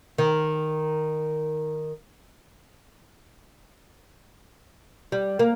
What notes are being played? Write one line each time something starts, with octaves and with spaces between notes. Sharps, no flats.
D#3
G3
A#3